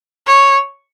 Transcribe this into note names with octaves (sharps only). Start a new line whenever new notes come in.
C#5